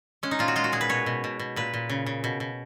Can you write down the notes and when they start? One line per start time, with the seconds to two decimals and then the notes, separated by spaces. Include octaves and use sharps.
0.23 G#3 C#4
0.31 D#4
0.39 A#2 F4
0.48 F#4
0.56 G#3 F4
0.64 F#4
0.72 A#2 G#4
0.81 B4
0.89 B2 C#5
1.06 B2
1.24 B2
1.39 B2
1.56 A#2 B4
1.74 A#2
1.90 C#3
2.06 C#3
2.24 B2
2.40 B2